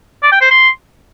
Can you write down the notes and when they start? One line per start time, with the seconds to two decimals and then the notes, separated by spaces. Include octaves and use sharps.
0.23 D5
0.32 G5
0.41 C5
0.50 C6